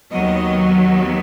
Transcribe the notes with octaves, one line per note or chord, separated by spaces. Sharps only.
D#2 D#3 F#3 B3 D#5